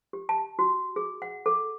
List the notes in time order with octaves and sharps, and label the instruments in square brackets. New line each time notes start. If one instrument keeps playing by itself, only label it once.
[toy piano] G4
A5
F#4
G#4
F#5
A4